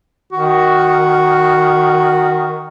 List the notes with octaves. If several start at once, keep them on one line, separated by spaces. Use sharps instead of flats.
D#3 F#4